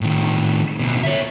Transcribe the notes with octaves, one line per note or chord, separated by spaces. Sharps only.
A2 D#3
D2 B2
C#5 E5